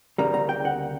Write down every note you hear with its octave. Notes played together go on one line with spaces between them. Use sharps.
D2 C#3 G3 A#3 A#5
A#5
G5
F#5